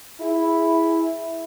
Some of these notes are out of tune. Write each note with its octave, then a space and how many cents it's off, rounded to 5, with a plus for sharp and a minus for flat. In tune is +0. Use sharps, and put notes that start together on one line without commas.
E4 +0 G#4 +0